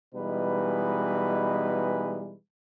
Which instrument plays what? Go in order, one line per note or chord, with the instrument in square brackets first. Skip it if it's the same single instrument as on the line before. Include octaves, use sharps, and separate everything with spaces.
[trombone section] B2 E3 G3 G#3 D#4 B4